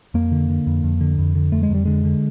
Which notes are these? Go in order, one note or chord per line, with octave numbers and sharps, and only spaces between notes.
F2 A#3
D3
D3
F2
F2
D3
F2
D3
F2 A3
G#3
F2 G3
D3 G#3
D3